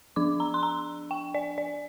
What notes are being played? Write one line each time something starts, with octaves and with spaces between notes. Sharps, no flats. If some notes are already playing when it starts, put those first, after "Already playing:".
F3 D4 D6
A#5
C6
A#5
G5
D5
D5